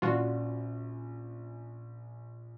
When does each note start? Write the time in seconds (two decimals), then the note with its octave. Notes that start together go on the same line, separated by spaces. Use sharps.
0.02 A#1 C#4 F4 F#4 D5